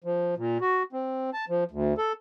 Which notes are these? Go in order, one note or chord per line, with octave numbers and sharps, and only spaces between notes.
F3
A#2
F#4
C4
A5
F3
D2
A4